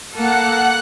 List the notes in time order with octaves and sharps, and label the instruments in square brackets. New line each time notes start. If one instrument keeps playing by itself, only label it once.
[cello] A#3 A4 [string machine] F#5 F#6